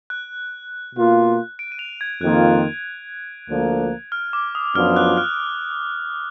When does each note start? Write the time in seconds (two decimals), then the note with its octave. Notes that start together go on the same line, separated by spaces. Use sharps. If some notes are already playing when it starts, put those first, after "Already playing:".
0.10 F#6
0.95 B2 A#3 F4
1.59 D7
1.72 D#7
1.79 F7
2.01 G#6
2.21 F2 D#3 A#3 F4 F#6
3.48 D2 D3 F3 A#3
4.12 F6
4.33 D6
4.55 D#6
4.75 F#2 F3 B3 D4 F4 F6
4.96 F#6
5.17 F6